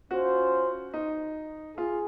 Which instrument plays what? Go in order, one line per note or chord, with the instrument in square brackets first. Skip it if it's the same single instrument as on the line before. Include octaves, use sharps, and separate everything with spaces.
[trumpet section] C#4 F4 C5 [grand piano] F#4
[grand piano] D#4
[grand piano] F4 [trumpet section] G#4